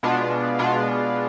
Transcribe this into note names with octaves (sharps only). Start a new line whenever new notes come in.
B2 G#3 B3 D4 F4
B2 G#3 B3 D4 F4